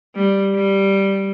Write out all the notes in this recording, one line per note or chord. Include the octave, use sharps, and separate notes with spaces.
G3
G3